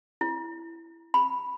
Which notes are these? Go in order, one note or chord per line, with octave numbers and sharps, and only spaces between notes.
E4
B5